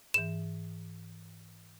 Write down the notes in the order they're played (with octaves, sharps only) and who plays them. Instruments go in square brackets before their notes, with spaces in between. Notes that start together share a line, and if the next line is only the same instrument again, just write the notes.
[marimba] G#2 E3 [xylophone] E7